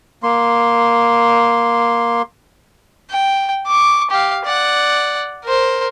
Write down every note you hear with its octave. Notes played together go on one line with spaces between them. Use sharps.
A#3 C6
G5
C#6 D6
G4 F5
D5 F#5
A#4 C5